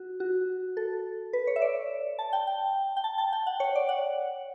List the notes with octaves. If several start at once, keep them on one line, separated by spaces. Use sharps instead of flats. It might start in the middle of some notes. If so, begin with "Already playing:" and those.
Already playing: F#4
F#4
A4
B4
C#5
E5
D5
A5
G5
G5
G5
A5
A5
G5
F#5
C#5
D5
F#5